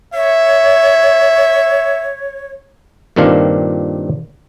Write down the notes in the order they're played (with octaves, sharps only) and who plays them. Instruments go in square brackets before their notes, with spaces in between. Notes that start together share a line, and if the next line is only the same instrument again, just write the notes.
[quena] C#5 [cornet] E5
[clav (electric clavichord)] G2 A#2 D#3 C4 D4 F5